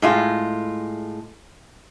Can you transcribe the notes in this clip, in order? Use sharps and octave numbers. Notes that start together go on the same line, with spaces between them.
A2 G#3 F4